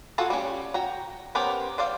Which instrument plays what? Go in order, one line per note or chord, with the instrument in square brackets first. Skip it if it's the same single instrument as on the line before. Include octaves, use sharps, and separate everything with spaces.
[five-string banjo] F4 F#4 G#4 A4 F#5
G3 C#4
F#4 G5 A#5
B3 C#4 G4 A#4 C5
G3 C5 D5 F5